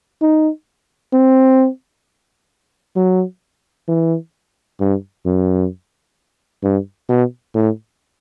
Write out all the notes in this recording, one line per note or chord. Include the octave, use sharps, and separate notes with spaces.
D#4
C4
F#3
E3
G2
F#2
G2
B2
A2